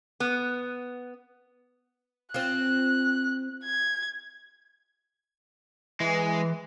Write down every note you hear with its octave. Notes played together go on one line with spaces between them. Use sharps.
B3
C4 F4 F#6
G#6
E3 G#3